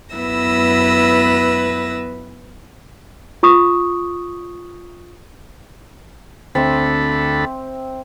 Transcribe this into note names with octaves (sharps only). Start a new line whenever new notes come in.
F#2 B3 E4 B4 E6 A#6
F4 C#6 D#6
D2 C4 A4 E5 B5